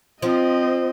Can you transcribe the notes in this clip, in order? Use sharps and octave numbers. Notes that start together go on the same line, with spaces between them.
F3 C4 D#5